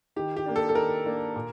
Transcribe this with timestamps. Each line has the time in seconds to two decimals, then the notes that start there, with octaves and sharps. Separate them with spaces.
0.16 D#3 G4
0.37 G4
0.46 A#3 D4
0.56 A4
0.69 A4
0.75 D#3 A#4
1.06 A#3 D4
1.36 A#2